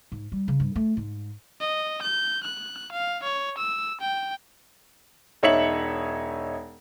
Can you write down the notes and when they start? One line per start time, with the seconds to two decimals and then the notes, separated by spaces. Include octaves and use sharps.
0.12 G#2
0.32 G3
0.48 C#3
0.60 G2
0.76 A3
0.97 G#2
1.61 D#5
2.02 G6
2.44 F#6
2.92 F5
3.23 C#5
3.58 E6
4.01 G5
5.43 E1 D#4 C#5 E5 C#7 F#7